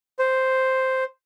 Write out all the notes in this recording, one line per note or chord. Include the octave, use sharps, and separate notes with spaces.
C5